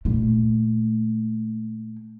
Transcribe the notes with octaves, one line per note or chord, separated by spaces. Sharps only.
A#2 A3